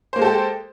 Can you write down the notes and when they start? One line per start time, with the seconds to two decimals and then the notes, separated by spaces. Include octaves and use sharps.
0.13 C5
0.16 A#3
0.19 G#3
0.22 A4
0.25 G4